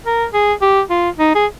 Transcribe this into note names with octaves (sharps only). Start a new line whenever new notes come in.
A#4
G#4
G4
F4
D#4
G#4